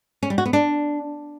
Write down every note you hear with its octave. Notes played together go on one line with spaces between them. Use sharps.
C#4
G3
F#4
B3
D4